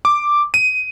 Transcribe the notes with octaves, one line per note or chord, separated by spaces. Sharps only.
D6
D#7